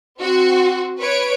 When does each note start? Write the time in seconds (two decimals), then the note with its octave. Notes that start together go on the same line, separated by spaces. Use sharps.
0.20 C4 F#4
0.99 B4 C#5 D7